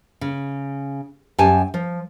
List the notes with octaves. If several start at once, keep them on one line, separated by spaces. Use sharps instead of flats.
C#3
F#2 G4 G#5 A5
F3